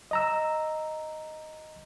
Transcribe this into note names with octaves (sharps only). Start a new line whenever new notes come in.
D#5 A#5 E6